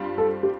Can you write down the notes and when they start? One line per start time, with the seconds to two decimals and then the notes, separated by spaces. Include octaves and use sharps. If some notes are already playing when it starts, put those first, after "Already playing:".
Already playing: G2 G3 C4 F4
0.18 A4
0.43 G4